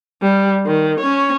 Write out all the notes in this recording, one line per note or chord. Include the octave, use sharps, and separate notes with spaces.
G3
D#3
C#4 C#5